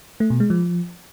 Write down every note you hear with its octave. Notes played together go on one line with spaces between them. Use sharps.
A3
B2
G#3
F3